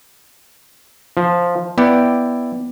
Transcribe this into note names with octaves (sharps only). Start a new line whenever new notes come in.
F3
B3 E4 D5 G5